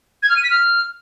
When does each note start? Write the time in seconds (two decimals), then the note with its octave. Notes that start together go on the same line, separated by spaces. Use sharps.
0.23 G#6
0.29 F6
0.36 D#7
0.43 B6
0.50 F6